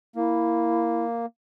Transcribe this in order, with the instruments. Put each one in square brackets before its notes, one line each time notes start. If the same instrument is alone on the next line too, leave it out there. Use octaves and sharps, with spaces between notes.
[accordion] A#3 [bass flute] E4